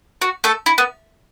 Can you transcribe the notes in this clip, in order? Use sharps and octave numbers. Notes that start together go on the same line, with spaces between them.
F#4
A3 A4
E4
B3